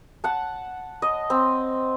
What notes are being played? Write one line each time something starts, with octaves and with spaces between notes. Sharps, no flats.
F#5 A5
D#5
C4